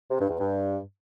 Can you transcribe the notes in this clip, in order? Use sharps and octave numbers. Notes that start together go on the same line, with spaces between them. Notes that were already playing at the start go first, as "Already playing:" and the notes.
C3
G2
E2
G2